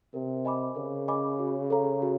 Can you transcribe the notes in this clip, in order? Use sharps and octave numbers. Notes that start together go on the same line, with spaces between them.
C3 A#4
D#5 G#5 B5 D6
C#3 A#4
D#5 G#5 B5 D6
F#4
A4 C#5 F5 A#5
F#4